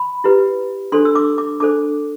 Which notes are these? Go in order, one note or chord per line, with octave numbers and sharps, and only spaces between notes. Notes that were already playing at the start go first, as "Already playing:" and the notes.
Already playing: B5
E4 G4 B4
D4 A4 C5 C6
E6
D6
D6
D4 A4 C5 D6